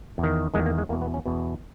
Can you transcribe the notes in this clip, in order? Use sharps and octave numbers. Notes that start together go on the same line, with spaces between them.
E2
D#3
E2 D#3 G#3
A#3
G#3
E2 B2 A#3
B3
C#4
E2 B2